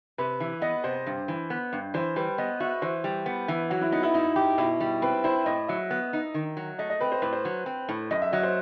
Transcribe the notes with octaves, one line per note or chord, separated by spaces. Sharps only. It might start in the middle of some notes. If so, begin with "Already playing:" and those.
C3 B4
E3
B3 D#5
C3 C5
G2
E3
B3
G2
E3 C5
G3 B4
B3 D#5
F#4 E5
E3 C5
G3
B3
E3
F#3 F#4
E4
B3 D#4
E4
D#4 E4
G4
B2 E4
G3
C4 B4
E4 C5
A2 D#5
F#3 E5
B3
D#4
D#3
F#3
A3 D#5
D#5
C4 B4
C5
A2 B4
C5
F#3
C4
A2
F#2 D#5
E5
F#3 D#5
C5